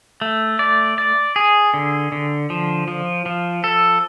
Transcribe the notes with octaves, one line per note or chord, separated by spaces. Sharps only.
A3
D5
D5
G#4
D3
D3
F3
F3
F3
A4